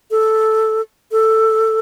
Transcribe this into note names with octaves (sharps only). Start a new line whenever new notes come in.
A4
A4